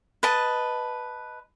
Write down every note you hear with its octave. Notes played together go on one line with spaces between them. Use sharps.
B4 D#5 A5